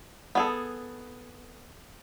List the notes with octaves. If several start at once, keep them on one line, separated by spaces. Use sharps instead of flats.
B3 G#4 A4